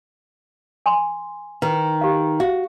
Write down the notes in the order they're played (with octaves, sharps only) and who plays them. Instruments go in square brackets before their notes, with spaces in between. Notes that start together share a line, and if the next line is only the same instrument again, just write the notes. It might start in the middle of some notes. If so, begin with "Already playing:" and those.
[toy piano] G#5 C6
[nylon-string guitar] D#3 [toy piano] B4
[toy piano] G4 F5
[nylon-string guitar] F#4 [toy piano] F5